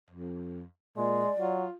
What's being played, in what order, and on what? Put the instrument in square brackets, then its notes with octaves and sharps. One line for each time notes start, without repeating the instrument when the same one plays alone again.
[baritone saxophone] F2
[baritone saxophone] A#2 [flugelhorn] G#3 [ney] D5
[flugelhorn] F#3 [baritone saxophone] F4